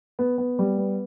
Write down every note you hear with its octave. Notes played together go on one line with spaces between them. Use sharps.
B3
B3
G3
B3